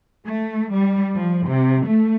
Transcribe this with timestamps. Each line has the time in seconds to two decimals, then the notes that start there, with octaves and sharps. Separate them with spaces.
0.25 A3
0.72 G3
1.16 F3
1.48 C3
1.86 A3